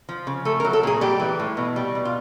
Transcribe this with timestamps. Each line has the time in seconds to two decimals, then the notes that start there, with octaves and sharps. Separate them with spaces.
0.09 F3
0.27 C#3
0.45 A3 A4
0.60 A#4
0.65 F#3
0.73 A4
0.83 A#2 G#4
1.01 G3 G4
1.20 E3
1.39 A2
1.57 B2
1.76 G3
1.95 B2
2.05 F4